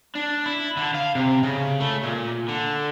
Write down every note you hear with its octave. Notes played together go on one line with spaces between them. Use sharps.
D4
E4
D3
F5
C3
C#3
A3
A#2
D3